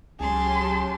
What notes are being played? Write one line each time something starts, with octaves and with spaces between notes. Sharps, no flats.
C#2 F#3 C#4 G4 G#4 A5 C6